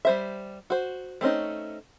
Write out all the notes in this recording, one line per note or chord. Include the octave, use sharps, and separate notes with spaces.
G3 C5 E5
F#4 C5
A3 C4 C#4 D#4